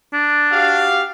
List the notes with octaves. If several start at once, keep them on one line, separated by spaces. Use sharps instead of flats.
D4
F#4 G4 F5